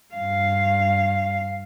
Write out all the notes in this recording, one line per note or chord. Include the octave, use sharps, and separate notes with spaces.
G2 F5